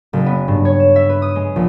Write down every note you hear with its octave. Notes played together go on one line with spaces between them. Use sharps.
F#1
B3
G2
C#5
E7
E5
B4
D#6
G#3
A#1